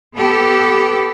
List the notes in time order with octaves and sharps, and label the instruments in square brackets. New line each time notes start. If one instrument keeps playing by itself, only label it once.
[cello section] B3 G4 A4